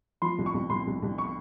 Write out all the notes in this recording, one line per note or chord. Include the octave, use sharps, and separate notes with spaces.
F3 C6
C2
C#6
C2
C2 C6
C2
C2
C#6